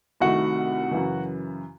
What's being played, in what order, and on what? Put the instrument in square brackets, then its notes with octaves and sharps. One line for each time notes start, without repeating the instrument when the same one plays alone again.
[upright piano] C2 C3 D#3 A3 [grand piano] F#4 F#5
[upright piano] F#2 C#3 E3